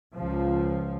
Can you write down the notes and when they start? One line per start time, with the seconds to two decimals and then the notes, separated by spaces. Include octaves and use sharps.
0.14 C#2 F3